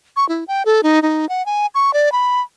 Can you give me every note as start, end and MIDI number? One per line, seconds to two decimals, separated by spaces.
0.16 0.27 85
0.29 0.44 64
0.48 0.63 79
0.66 0.81 69
0.83 1.02 63
1.02 1.29 63
1.29 1.45 78
1.46 1.66 80
1.75 1.94 85
1.94 2.12 74
2.12 2.41 83